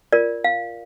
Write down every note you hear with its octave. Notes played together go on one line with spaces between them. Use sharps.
F4 A#4 D5
F5